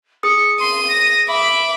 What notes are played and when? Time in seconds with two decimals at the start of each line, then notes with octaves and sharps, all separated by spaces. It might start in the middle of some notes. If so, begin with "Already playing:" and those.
0.23 G#4 D#6 C#7
0.60 C6 D#7
0.88 A#6
1.28 E5 B5 D6